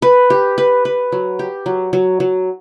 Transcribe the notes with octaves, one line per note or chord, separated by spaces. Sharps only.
B4
G4
B4
B4
F#3
G4
F#3
F#3
F#3